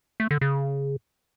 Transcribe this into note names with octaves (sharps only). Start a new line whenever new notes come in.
A3
D3
C#3